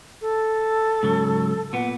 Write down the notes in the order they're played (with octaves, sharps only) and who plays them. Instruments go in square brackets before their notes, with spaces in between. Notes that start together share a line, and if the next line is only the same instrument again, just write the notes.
[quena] A4
[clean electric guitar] G#2 C#3 F#3
[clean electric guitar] A#2 B3 [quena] F#5